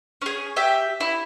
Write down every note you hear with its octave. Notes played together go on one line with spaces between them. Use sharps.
C#4 G#4
G4 E5
E4